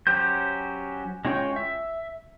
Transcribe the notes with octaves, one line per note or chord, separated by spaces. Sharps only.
F#3 C#4 G4 C5 G6
G#3 C#4 F4 C#5 G5
E5